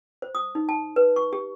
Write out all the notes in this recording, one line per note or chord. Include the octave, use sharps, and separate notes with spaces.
C5
D#6
D#4
A5
B4
C#6
G4